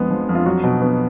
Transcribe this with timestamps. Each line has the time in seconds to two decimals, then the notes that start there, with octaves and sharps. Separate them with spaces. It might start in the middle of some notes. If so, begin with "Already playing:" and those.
Already playing: F2 F3 G#3 B3
0.11 F3
0.29 F2
0.35 F4
0.46 F#3 F#4
0.64 B2
0.82 B3